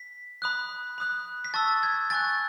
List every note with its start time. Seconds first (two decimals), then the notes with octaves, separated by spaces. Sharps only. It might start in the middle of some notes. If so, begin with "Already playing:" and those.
Already playing: B6
0.42 B5 D#6 F#6
0.98 B5 D#6 F#6
1.45 B6
1.54 A5 C#6 E6 A6
1.83 G#6
2.10 G#5 C#6 F#6 A6